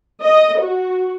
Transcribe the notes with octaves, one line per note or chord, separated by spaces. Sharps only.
D#5
F#4